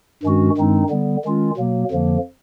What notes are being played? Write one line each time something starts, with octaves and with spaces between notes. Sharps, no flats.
G2 D#3 G#3 C#4 F#4
G2 D#3 G#3 C4 D#4
D3 G3 B3
D#3 G#3 C#4 F4
B2 F#3 A#3
F2 D3 F3 A#3